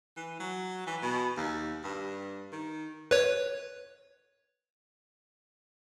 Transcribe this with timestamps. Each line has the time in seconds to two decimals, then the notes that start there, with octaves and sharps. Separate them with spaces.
0.16 E3
0.40 F#3
0.87 E3
1.02 B2
1.37 D#2
1.84 G2
2.52 D#3
3.11 B4 C#5